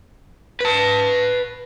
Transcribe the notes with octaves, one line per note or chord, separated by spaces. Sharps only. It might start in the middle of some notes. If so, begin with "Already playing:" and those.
B4 A5